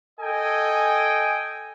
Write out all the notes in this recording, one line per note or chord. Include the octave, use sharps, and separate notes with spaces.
A4 D#5 G5 G#5